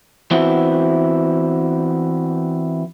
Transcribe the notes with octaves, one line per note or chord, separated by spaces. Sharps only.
E3 B3 C4 E4 F#4